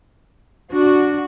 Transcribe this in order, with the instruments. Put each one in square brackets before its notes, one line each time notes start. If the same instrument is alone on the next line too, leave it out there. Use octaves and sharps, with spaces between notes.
[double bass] D4 [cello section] F#4